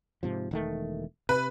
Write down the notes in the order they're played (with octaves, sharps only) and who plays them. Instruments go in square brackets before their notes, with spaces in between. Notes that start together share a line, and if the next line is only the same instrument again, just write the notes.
[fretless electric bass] G#2 C3 F3
E1 D#3 A3
[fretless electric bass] C3 [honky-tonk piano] B4